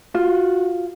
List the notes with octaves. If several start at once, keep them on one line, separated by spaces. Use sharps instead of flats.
F4 F#4